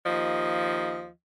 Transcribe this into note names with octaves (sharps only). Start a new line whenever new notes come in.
D#2 F3 D#5